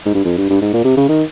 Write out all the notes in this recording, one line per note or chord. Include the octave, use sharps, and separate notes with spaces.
G#2
G2
F2
G2
G2
G#2
A#2
C3
C#3
D#3